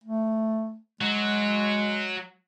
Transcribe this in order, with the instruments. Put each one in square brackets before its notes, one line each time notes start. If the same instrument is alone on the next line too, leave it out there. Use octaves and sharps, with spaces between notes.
[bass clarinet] A3
[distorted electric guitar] F#3 [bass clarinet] G#3